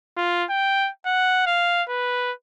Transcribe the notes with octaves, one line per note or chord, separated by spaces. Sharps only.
F4
G5
F#5
F5
B4